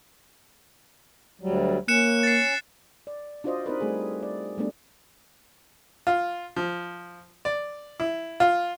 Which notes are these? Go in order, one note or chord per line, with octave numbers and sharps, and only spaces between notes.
D2 F#3 G3
A#3 C#4 F#6 C#7 E7
A6 C7
D5
D4 F4 F#4 C5 D5 D#5
C4 D#4 A#4 B4
G3 A3 C4 G#4
D5
G3 A3 B3 D4
F4
F3
D5
E4
F4